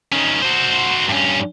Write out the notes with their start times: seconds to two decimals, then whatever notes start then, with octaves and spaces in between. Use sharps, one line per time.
0.12 D#3 C#4
0.42 F#4 C5
1.09 G2 C#4